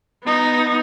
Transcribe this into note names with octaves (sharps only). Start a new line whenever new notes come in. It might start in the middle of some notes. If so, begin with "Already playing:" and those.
B3 D#4